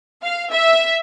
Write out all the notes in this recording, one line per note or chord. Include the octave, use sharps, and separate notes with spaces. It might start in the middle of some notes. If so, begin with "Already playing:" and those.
F5
E5